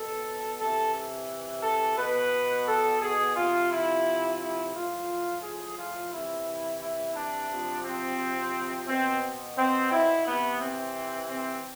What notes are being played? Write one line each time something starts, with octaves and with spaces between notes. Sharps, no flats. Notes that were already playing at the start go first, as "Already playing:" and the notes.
Already playing: B2 A4
C3 E3 A4
A4
B2 B4
A4
G#4
C3 F3 F4
E4
E4
A2 F3 F4
G#4
F4
C3 E3 E4
E4
D4
C3 F3
C4
B2 C4
C4
E4
C3 E3 B3
C4
C4